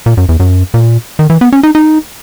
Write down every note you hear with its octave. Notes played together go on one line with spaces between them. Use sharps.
A#2
F#2
E2
F#2
A#2
D#3
E3
B3
C#4
D#4
D#4